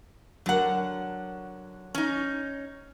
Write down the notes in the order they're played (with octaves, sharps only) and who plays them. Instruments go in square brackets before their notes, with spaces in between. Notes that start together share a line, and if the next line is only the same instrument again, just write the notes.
[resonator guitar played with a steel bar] D3 F#5 [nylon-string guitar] F#3 A#4
[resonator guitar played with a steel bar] C#4 D#4